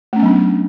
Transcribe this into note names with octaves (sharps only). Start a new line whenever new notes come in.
F#3 A3 B3 C#4 D4